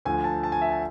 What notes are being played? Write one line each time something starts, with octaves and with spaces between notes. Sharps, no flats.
D2 D3 F3 G#5
A5
A5
G#5
E5
A5